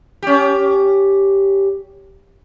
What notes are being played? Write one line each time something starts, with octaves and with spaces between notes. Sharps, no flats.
C#4 G4